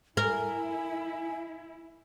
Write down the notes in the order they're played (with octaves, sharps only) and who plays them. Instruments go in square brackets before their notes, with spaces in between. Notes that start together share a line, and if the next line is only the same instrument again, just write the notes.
[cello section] E4 [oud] A#4 [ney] G#5